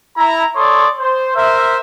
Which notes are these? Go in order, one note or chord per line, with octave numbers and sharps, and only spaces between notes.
E4 A#5
A4 C#5 D5 C6 D#6
C5
A#4 C5 E5